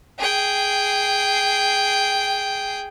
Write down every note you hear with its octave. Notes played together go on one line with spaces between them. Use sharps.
G#4 G5